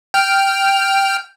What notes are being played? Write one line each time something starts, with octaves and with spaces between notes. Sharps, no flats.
G5 F6